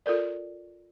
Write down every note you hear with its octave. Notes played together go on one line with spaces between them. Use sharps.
F4 A4 A#4 D5